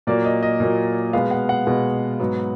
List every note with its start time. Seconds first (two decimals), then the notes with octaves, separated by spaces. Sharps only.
0.07 A#2 F#3 A#3 D5
0.25 D#5
0.43 D#5
0.60 A#2 F#3 A#3
1.13 B2 G#3 B3 F5
1.31 F#5
1.49 F#5
1.67 B2 G#3 B3
2.20 G#2 F#3 B3